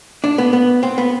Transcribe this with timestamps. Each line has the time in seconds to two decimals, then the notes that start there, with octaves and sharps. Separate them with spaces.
0.24 D4
0.38 B3
0.53 B3
0.83 C4
0.98 B3